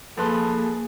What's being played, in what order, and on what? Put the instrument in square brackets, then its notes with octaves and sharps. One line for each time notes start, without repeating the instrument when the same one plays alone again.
[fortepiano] F2 B4 C6 [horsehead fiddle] A#3 G#4 [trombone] A4